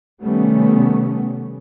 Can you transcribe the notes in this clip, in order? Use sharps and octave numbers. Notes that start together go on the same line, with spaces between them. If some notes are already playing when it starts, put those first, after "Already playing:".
C3 D#3 G3 A3 B3 C#4